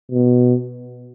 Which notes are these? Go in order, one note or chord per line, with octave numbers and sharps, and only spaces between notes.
B2